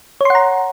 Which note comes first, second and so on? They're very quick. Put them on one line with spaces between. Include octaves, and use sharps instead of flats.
C#5 C6 F#5 A#5